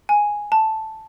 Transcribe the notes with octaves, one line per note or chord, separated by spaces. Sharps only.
G#5
A5